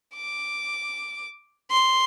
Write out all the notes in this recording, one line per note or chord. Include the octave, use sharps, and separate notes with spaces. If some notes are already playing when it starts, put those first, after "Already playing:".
D6
C6